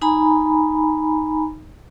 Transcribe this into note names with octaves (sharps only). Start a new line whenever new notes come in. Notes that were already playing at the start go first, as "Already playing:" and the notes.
D#4 G#5 A#5 B5